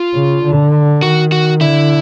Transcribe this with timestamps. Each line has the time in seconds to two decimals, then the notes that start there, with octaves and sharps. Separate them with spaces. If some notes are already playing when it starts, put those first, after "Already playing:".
Already playing: F4
0.14 C#3
0.44 D3
1.02 D#3 F#4
1.32 F#4
1.61 D3 E4